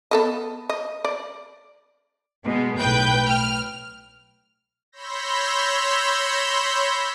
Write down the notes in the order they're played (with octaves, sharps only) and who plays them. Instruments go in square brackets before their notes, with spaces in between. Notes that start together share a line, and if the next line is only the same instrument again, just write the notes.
[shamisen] B3 A4 D#5
D#5
D5
[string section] B2 G#3
B1 A2 B4 G5 G6
F6
[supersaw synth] C#5 B5 C6 E6 G6 A#6